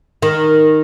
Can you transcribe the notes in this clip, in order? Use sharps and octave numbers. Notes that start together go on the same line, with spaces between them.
D#3